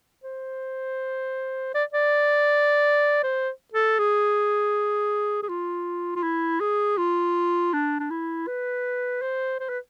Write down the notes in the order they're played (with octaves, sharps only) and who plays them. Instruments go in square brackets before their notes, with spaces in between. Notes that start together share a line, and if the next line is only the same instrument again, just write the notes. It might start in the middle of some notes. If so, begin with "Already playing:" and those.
[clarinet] C5
D5
D5
C5
A4
G#4
G#4
F4
F4
E4
G#4
F4
D4
D4
E4
B4
C5
C5
B4